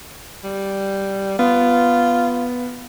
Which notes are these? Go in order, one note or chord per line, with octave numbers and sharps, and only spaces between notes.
G3
B3 F4